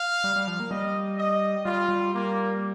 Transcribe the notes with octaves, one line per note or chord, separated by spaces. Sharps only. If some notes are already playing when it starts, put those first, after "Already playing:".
Already playing: F5
G3
G3
F3
A#3
G3 D#5
D#5
G3 F4
G3
A#3